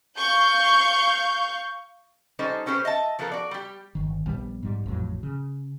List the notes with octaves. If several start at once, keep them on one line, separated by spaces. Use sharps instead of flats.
F5 C#6 G6
G3 C#4 D#4 A4 C5
B3 C#4 G4 A4 C5
D#5 E5 A5
F3 B3 F4 A4 A#4
F#4 D5
G3 G4
G1 D#3
A#1 G3 B3
G#2 G3
A1 F2 A2 F#3
C#3